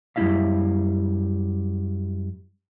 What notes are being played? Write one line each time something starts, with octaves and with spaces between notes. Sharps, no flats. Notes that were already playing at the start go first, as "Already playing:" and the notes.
F#2 G3 A3 E4 E5 F5